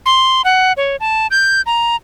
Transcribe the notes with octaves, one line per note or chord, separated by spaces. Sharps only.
C6
F#5
C#5
A5
G6
A#5